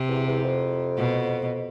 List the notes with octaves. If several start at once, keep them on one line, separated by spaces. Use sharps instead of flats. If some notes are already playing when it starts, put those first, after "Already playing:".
Already playing: C3
E2
E2
F2
B2